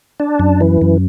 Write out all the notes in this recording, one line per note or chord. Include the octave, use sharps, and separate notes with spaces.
D4
F#2
E3
F#2